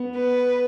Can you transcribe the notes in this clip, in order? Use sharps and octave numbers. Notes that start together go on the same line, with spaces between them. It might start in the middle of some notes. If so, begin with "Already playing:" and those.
Already playing: B3
B4